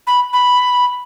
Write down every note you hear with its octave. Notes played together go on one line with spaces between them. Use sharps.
B5
B5